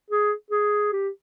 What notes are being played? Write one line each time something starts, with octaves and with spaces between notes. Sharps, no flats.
G#4
G#4
G4